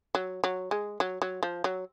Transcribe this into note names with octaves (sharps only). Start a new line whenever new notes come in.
F#3
F#3
G#3
F#3
F#3
F3
F#3